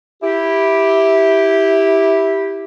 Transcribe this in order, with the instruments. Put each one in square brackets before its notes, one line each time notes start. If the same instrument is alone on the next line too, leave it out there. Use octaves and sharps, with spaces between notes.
[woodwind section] E4 G4